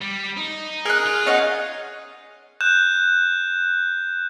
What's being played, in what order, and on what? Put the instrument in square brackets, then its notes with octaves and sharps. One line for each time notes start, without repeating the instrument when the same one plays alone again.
[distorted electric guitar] G3
D#4
[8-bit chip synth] G#4 [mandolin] A#4 F#6
[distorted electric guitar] F4
[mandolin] C#4 D#4 F#5
[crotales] F#6 G6 E7